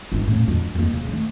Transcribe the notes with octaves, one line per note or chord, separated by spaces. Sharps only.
G1 F#2
A2 C#3
F2 D3
F2 A#3
C#3 F#3
D#3 A3